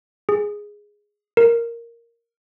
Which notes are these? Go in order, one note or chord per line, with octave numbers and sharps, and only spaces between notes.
G#4
A#4